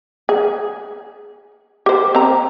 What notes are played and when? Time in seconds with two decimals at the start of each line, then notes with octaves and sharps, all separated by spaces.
0.29 G#4
1.86 G4 C5
2.15 C4 A#5